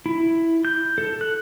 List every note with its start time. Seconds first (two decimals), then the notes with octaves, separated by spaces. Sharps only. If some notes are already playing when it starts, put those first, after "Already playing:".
0.06 E4
0.65 G6
0.98 A4
1.21 F#6